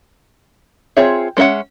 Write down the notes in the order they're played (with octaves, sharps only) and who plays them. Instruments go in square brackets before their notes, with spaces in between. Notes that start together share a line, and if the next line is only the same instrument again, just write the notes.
[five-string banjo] C4 F4 G#4 C#5 E5
G#3 C#4 A#4 E5 F#5